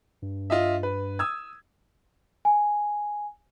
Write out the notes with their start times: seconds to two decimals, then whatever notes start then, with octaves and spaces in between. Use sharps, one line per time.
0.22 G2
0.50 F4 D#5 E5
0.83 B4
1.19 D#6 E6 G#6
2.45 G#5